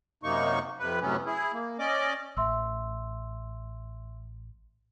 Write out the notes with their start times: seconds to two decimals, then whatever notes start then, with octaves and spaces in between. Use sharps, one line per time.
0.23 F#2 C3 A#3 D#4 C#6
0.79 F2 C3 B4
1.01 F#2 A2 C3 F#3 B3 C#4
1.26 E4 G#4
1.53 A#3
1.79 C#4 D5 D#5 D6
2.37 A1 E5 C6 E6